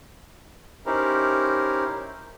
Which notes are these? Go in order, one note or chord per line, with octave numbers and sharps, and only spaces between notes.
C#4 D#4 E4 G4 A#4 C5